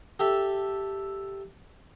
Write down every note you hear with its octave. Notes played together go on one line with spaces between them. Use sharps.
G4 A4 E5